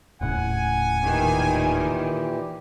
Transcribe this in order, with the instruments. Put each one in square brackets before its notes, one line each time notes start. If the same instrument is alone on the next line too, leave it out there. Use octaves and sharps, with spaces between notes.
[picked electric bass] D#1 A2 C#3 [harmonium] F#5 [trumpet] G#5
[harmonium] A#2 E3 G4 [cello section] D#3